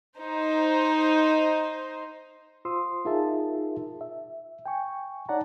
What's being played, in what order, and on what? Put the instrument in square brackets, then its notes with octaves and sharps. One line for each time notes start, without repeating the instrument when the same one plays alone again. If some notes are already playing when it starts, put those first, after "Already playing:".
[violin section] D#4 C5
[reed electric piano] F4 C5 C6 D#6 E6
D#4 F4 G#4 A#4 E5 A5
E5
G5 G#5 C#6
D#4 C#5 D5 F#5 A5 A#5